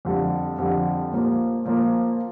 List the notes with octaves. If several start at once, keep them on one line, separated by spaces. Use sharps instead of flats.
F2 D3 G3
F2 D3 G3
A#2 F3 A#3
A#2 F3 A#3